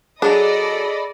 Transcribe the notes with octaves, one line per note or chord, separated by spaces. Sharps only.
F#3 D4 G#4 A4 D5 D#5 B5